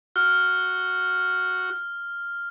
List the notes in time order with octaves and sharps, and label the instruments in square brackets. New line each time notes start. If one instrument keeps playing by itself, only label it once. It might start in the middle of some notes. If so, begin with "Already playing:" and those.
[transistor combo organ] F#4 [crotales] F6